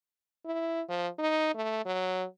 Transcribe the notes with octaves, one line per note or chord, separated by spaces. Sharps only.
E4
F3
D#4
A3
F#3